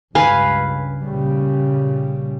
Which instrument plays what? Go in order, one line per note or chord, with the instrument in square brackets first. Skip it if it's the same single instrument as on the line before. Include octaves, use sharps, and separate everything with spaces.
[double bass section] C#2 G2 [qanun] B4 F5 G#5
[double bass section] A#2 C#3 G3